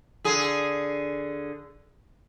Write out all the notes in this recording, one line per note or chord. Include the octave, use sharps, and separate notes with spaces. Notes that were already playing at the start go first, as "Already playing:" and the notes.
D3 G#4